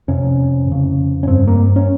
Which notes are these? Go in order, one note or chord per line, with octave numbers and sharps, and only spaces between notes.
F2 C3 C#4
F2 C#3
C#4
G2 C4
A#3
C#4